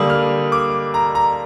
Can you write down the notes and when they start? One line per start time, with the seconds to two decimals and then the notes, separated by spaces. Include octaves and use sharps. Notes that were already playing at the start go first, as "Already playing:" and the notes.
Already playing: D3 G3 A#3 D#6
0.10 F6
0.52 D6
0.94 A#5
1.15 A#5